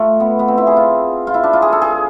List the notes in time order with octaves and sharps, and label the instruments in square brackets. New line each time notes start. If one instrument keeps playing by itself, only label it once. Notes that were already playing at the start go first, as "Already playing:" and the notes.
Already playing: [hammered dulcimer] A3 F4
B3
B3
C4
E4
G#4
F4
F4
E4
D4
F4
G#4
A4
G#4